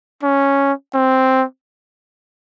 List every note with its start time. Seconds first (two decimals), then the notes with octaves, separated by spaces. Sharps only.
0.23 C#4
0.94 C4